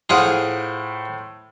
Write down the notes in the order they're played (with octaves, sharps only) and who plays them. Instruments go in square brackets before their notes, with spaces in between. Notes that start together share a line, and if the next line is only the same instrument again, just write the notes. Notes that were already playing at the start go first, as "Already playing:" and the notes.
[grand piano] A2 C5 D7 [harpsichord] F4 G#4 F#5